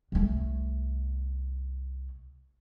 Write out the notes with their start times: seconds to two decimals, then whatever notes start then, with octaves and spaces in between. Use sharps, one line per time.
0.12 C2 A3